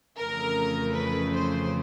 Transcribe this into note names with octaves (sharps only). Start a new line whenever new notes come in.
F2 C#3 E3 A3 A#4
B4
C5